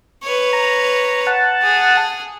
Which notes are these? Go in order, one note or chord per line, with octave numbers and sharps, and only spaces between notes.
B4 C#5
A#5
F#5 A5
G#4